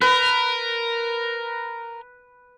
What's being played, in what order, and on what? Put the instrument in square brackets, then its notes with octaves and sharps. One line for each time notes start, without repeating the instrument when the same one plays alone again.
[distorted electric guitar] A#4 [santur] B4